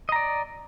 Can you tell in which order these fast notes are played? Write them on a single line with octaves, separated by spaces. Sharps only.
D#5 A#5 D5